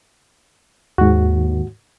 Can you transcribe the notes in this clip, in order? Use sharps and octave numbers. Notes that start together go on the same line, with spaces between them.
D#2 G#2 F#4